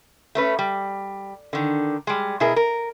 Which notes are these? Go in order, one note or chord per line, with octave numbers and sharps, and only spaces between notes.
A3 C#4 B4
G3
D3 D#3
G3 G#3
B2 E4 G#4 A#4
A#4